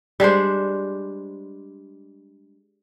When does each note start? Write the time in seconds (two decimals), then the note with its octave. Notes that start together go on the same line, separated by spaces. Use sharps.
0.20 G3 G#3 D4 C5